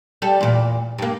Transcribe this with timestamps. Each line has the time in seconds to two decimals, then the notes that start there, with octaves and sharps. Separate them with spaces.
0.22 G3 A4
0.41 E2 A#2
0.99 G2 A#3